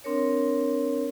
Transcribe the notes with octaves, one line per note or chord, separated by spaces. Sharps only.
C4 D4 A#4 C#5